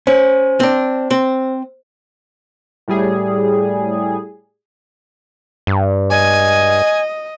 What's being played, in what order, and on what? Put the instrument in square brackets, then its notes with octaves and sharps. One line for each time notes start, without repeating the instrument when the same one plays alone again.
[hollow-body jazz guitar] C#4 [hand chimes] C5
[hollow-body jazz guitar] C4 D4
C4
[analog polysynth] A2 G3 G#4
[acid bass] G2
[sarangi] D#5 [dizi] G#5